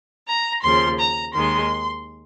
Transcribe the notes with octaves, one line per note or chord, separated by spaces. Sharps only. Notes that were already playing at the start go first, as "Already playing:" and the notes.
A#5
D#2 C#3 F3 C6
A#5
D#2 D#3 G#3 C6